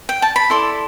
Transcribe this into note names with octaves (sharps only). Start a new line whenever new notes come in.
G5
A5
B5
E4 A4 D5 C6